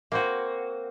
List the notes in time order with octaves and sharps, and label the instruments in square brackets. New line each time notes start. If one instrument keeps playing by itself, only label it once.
[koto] A#3 C4 F#4